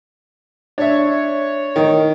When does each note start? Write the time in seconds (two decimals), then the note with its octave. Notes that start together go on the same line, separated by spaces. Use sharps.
0.78 D4 C#5 E5
1.76 D#3